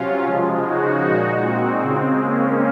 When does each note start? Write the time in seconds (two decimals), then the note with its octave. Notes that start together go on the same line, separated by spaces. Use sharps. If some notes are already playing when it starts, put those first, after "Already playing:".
Already playing: C3 F#3 C#4 F4
0.25 C#3 F3 G#3
0.65 D#4 F#4
1.04 A#2 G#3
1.43 C4
1.82 C#3 G#3
2.21 A#3 C#4